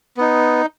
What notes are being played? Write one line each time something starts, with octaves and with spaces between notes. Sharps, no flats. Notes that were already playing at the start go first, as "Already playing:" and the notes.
B3 D#4